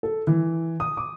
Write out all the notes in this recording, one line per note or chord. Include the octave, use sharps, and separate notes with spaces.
A4
E3
D#6
D6